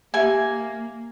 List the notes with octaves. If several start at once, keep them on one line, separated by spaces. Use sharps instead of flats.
A#3 G4 E5 G#5